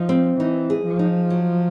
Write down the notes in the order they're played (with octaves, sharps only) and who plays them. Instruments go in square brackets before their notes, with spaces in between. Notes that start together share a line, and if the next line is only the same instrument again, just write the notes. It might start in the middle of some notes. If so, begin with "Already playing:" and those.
Already playing: [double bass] F3 [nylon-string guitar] D#4
[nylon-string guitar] C4
[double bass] E3 [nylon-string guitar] D#4
[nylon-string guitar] G#4
[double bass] F3
[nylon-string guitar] D#4
F#3